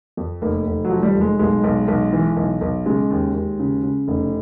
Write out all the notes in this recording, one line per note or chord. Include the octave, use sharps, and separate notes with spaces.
F2
F1 A#3
F1
F#3
F3
G3
F1
G#3
B1 G#3
B1
B1
E3
B1
B1
C#3 G#3
D#2
D#2
C#3
C#3
F1